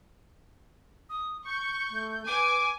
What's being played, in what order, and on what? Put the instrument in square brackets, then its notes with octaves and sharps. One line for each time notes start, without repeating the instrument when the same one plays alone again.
[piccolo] D#6
[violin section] C#6 [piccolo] G6
[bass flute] A3
[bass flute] B4 [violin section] G#5 [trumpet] D6